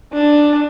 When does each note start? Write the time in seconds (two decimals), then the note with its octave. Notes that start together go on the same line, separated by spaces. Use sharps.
0.13 D4